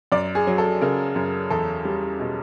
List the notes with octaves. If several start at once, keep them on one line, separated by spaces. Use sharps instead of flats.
F#2 D5
G#4
F#3
A4
C#3 A#4
F#2
E2 A4
G3
B2